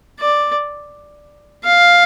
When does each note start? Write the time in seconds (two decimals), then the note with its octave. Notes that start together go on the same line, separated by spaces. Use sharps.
0.19 D5
1.64 F5